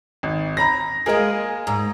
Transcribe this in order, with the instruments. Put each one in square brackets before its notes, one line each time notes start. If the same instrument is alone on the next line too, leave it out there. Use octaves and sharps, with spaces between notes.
[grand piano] G#1
A#5 B5 A#6
[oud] G#3 A#3 [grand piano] G#4 A#4 D#5
[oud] G#2 [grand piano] A#5